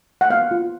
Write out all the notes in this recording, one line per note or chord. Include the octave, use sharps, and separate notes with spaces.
F#5
B3 F5
F4